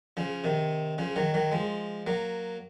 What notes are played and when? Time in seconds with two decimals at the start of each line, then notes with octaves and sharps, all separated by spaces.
0.17 C#3 F3
0.44 C3 D#3
0.98 C#3 F3
1.16 D#3 F#3
1.34 D#3 F#3
1.51 F3 G#3
2.07 F#3 A#3